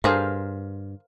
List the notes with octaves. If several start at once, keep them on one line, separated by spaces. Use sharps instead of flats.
G2 D3 G#4 A#4 C5 F5